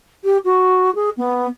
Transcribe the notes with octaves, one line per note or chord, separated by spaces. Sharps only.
G4
F#4
G#4
B3